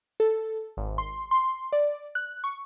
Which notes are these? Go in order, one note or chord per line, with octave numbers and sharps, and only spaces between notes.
A4
G#1
C6
C6
D5
F#6
C#6